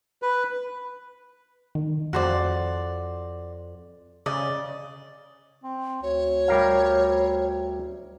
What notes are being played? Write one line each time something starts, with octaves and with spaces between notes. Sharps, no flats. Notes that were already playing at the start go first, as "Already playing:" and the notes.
B4
D#3
F2 F#4 C5 D5
C#3 D5 D#5
C4
D2 C#5
G3 A#4 F5